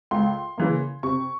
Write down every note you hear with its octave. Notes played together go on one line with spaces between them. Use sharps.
C#2 C6
C#3 E3 A#3
C3 C#6